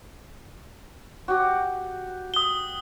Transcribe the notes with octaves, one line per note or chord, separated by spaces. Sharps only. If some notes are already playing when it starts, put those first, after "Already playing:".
F#4 G4
D#6 G7